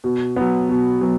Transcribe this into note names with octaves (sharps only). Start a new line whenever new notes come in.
B2
F#3 B3
B2
F#3 B3